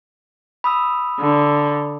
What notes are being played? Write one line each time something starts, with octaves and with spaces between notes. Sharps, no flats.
B5 D#6 E6
D3